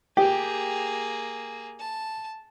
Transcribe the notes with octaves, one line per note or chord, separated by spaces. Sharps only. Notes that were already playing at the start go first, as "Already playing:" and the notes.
A#3 G4 G#4
A5